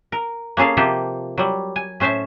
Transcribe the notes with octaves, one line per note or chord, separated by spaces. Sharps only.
A#4
A#3 C#4 G#4 A4 F5
C3 F3 A#3 G4 A4
F#3 G3
G#5
A2 C#4 C5 E5 A5